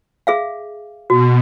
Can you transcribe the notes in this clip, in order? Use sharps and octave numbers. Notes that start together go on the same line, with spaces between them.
G#4 E5 F5
B2 F#4